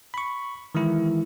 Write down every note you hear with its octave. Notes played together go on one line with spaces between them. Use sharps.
B5 C#6
D#3 E3 G#3 E4